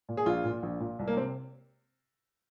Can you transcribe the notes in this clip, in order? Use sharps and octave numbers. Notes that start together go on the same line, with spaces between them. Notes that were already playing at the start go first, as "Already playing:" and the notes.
A#2
G#4
A#1 F4
A#2
A#1
A#2
C2
A#3
C3 C4